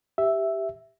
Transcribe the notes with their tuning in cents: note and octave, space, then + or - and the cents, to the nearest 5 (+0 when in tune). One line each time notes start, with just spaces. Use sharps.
G4 +0 E5 +0